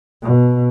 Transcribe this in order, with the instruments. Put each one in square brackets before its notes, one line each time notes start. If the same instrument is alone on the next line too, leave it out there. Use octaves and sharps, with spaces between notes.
[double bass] B2